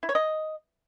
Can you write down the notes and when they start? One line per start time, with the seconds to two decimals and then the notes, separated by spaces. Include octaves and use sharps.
0.03 E4
0.09 C#5
0.15 D#5